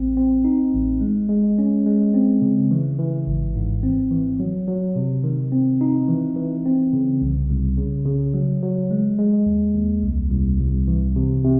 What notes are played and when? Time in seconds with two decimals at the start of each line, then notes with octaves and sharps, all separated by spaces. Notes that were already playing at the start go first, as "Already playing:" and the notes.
Already playing: A1 C4
0.17 C4
0.45 D#4
0.74 A1
1.01 G#3
1.29 G#3
1.58 C#4
1.86 G#3
2.14 C4
2.42 C#3
2.71 E3
2.99 E3
3.27 G#1
3.55 G#2
3.83 C4
4.11 E3
4.40 F#3
4.68 F#3
4.96 C3
5.24 D#3
5.52 C4
5.81 D#4
6.09 E3
6.36 E3
6.66 C4
6.93 C#3
7.22 C2
7.49 C2
7.77 C#3
8.06 C#3
8.34 F#3
8.63 F#3
8.91 G#3
9.19 G#3
9.46 D#2
9.74 D#2
10.03 C2
10.31 C2
10.60 C2
10.88 E3
11.16 C3
11.44 C3